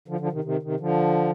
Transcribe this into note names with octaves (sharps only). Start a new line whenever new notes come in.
D3 F3
D3 F3
C3 D#3
C3 D#3
C3 D#3
D3 F3